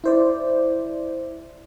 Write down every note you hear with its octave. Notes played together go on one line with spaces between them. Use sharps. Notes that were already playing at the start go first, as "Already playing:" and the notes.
E4 C5 D5